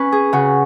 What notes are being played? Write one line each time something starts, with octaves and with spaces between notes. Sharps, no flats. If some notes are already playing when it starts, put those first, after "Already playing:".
Already playing: C#4 B4
G#4
C#3 F#4